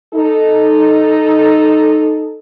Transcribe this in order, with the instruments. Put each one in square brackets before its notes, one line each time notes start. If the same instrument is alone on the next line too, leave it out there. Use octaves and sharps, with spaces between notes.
[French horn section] D#4 A4